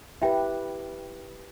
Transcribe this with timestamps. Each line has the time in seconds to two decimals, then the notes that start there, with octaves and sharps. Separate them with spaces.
0.22 E4 G4 B4 E5 G5